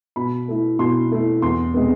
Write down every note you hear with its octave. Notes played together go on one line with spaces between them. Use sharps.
B2 B5
A3 E4
B2 C6
A3 E4
E2 C6
C3 G#3 B3